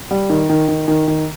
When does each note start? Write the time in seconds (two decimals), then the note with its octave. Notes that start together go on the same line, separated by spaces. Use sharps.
0.11 G3
0.30 D#3
0.49 D#3
0.68 D#3
0.88 D#3
1.08 D#3